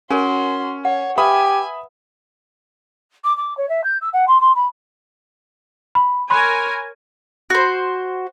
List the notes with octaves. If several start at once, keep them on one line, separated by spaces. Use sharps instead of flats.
C#4 F#4 A#4 C#5 G#5 C6
C#5 F#5
G4 B4 E5 G#5 B5 D#6
D6
D6
C#5
E5
G6
E6
F#5
C6
C6
B5
B5
A#4 C#5 G#5 B5 C6 F#6
F#4 C5